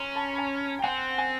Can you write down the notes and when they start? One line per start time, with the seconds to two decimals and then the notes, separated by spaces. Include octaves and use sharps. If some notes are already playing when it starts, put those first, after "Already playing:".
Already playing: C#4 A#5 C6
0.15 A5 B5
0.33 B5
0.38 G#5 A#5
0.79 G5
0.84 C4 F#5 G#5
1.18 G#5